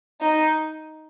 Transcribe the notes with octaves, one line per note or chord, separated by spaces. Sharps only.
D#4